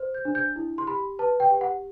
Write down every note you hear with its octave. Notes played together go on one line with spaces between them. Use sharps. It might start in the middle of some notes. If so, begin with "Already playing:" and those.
Already playing: C5
G6
D4
G6
E4
C6
G4 B5
B4 A5
G5
G4
F#5